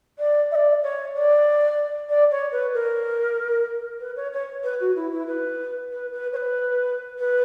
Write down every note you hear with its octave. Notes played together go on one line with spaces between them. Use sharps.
D5
E5
D5
C#5
D5
D5
C#5
B4
A#4
B4
C#5
C#5
B4
F#4
E4
E4
B4
B4
B4
C#5
B4
B4